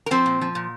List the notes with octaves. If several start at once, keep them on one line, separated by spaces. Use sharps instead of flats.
A#4
F3 C4 C5
A#2
F3
A#2